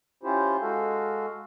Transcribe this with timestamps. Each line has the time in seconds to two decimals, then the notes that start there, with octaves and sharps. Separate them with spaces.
0.23 C#4 E4 F4 G4 C5
0.62 G#3 F#4 A4 F5